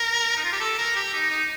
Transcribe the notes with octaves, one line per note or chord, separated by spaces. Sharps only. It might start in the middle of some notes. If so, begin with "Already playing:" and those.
Already playing: A#4
D#4
F4
G4
A4
A#4
G4
D#4
D#4